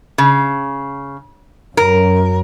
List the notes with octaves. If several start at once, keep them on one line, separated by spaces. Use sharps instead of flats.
C#3
F#2 A#4